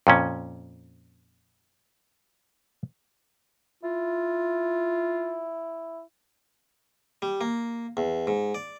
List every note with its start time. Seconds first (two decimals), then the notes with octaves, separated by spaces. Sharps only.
0.07 F2 A#2 C#4
3.83 E4 F4
7.22 G3
7.41 A#3
7.97 E2
8.27 G#2
8.55 D5